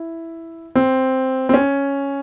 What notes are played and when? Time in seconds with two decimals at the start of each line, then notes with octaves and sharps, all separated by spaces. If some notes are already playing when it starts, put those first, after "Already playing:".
Already playing: E4
0.75 C4
1.49 C4
1.54 C#4